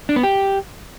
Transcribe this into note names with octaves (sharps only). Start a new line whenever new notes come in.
D4
B3
G4